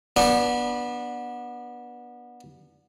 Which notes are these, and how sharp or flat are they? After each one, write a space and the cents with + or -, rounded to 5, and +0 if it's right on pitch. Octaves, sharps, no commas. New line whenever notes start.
B3 -25 D4 +0